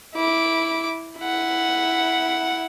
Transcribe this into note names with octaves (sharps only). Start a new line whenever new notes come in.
E4 D6
E4 F#5